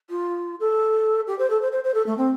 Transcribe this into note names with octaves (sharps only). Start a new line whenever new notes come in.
F4
A4
G4
C5
A4
C5
C5
C5
A4
A3
C4